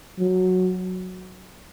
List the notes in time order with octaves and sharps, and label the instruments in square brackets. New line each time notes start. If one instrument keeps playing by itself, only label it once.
[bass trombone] F#3